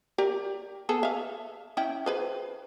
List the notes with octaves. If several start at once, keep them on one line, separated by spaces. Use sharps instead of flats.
G4 A#4 D5
B3 G#4 A4
E5 F5
C#4 E4 G5
G#4 B4 C5